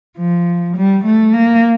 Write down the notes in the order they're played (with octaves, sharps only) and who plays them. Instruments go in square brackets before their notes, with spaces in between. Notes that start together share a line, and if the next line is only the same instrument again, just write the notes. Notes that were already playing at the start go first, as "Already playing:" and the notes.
[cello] F3
G3
A3
A#3